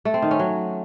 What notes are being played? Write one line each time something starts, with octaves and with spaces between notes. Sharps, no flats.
A3
C4
D#3
C#4
F#3